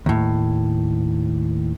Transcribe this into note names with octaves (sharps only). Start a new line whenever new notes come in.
D#2 A2